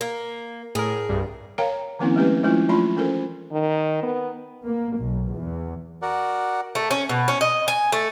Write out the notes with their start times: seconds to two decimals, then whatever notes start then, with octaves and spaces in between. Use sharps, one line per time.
0.01 A#3
0.75 A2 G#4 A#4
1.09 C2 G2
1.58 A#4 C#5 F5 G5 A#5
1.99 D#3 F3 A#3 C4 C#4 E4
2.16 G#3 A3 C#4 G4 B4
2.43 F3 G#3 A3 C#4 E4 F4
2.69 F#3 A3 D4 F4 B5 C6
2.96 E3 C#4 A4 A#4 C5
3.52 D#3
4.03 B3
4.64 A#3
4.99 B1
5.34 E2
6.02 F#4 A#4 D5 F#5
6.75 A3
6.91 C#4
7.09 B2
7.28 C#4
7.41 D#5
7.68 G#5
7.92 A3